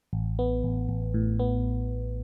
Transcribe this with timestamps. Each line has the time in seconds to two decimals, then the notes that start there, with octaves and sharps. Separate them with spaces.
0.13 A1
0.39 B3
0.64 A1
0.89 A1
1.14 A2
1.39 B3